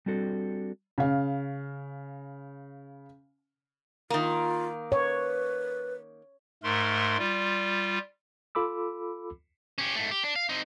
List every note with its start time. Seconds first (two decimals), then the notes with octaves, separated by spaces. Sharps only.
0.06 G3 C4 D4 F#4 A4
0.98 C#3 F5
4.10 D#3 A#3 F4
4.92 B4 C#5
6.63 G#2 A3 A#4 C6
7.18 G3 F4
8.55 F4 A4 B5 D6 E6
9.78 C#4 G4
9.96 G#2 A3
10.11 G4
10.24 D4
10.36 F5
10.49 C4 D#4